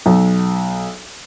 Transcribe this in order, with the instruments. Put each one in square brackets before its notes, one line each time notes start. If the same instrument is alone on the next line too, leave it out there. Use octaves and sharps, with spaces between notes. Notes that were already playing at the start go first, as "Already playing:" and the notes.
[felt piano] B1